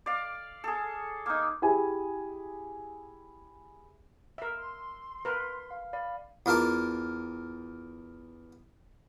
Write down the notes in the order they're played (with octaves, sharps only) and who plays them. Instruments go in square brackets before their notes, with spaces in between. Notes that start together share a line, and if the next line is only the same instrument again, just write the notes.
[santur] D5 F5
G#4 A4
A#3 D#4
[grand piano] E4 G4 G#4 G#5
[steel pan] A#4 E5 [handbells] E6
[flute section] C6
[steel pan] A#4 B4
[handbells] F5
D5 F5 B5
[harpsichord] E2 F4 A#4 A5 D6